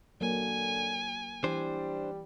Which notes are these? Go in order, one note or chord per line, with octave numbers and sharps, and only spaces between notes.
D3 F#3 A#3 G#5
E3 G3 D4 C5